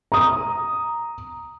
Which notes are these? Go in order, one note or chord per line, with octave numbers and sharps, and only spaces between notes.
A#5 D#6